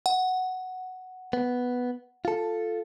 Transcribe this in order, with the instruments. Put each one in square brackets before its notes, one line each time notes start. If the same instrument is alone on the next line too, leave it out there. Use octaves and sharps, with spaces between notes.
[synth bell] F#5
[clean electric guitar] B3
F4 A4